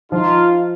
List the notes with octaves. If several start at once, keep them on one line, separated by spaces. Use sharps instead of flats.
F3 D#4 F4